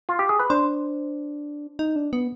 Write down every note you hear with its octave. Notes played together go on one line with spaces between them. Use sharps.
F4
G4
G#4
B4
D4 C5
D#4
D4
B3